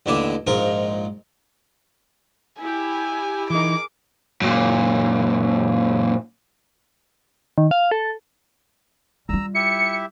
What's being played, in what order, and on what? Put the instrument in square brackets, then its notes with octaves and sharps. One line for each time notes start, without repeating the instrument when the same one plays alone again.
[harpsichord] A1 D#2 D3 E4 D6
A#1 G#2 F4 A#4
[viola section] E4 G4 [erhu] G#5
[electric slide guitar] E3 D#4 [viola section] G#4 A#4 [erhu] D6
[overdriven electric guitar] F#2 A#2
[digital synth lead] D#3
F5
A4
[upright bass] G3 F4 [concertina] A#5 E6
[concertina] E4 G4 E5 [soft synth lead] C#7